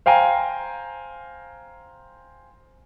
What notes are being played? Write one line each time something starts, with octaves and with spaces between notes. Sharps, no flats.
C5 F5 G5 G#5 A#5